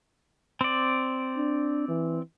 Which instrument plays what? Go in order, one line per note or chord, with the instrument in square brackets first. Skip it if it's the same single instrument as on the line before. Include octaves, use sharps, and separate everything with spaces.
[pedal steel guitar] C4 D5
[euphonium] D4
E3